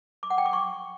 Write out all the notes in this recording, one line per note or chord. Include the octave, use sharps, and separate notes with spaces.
D6
F#5
G5
D6
C#6